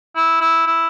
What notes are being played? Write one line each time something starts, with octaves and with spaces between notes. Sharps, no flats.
E4
E4
E4